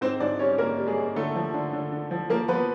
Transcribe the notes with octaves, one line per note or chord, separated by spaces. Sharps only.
G#2 C4 C5
G#2 D4 D5
G3 C#4 C#5
G#2 A#3 A#4
G3
G#3 G#4
A#3
D3 A3 A4
F3
D3
D3
D3
F3
F3 A#3 A#4
F3 B3 B4